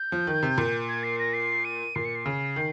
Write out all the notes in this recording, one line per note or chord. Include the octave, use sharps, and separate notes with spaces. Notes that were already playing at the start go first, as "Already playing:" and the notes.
Already playing: G6
F3
D#3
C3
A#2
G#6
C7
A#6
C7
D#7
A#2 C7
C#7
C7
C#3
D#3